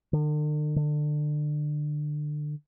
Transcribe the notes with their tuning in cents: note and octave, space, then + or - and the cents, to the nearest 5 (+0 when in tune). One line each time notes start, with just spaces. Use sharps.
D3 +45
D3 +25